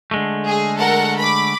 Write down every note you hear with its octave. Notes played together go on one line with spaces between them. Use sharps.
D3 G#3 A3
G#4
A4 A#4 F#5
B5 D6